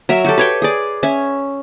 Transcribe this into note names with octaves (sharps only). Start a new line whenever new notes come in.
F#3 A#4 E5
F#4 G4 A4
B4 C#5 G5
G#4 D5
C#4 E5